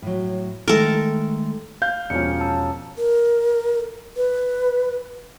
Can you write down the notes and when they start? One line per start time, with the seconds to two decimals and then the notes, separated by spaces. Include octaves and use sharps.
0.02 A2 F#3
0.68 D#3 G#3 A3 A4 A#4
1.82 F5 G6
2.10 E1 F3 C#4 C#7
2.40 A5 E6
2.98 A#4
4.16 B4